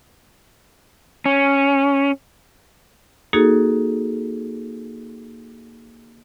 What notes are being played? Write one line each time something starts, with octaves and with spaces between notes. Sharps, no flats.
C#4
A#3 D#4 F#4 G#4 A4